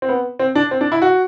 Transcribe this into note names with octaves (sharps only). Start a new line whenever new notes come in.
C4
B3
C4
D4
C4
D4
E4
F#4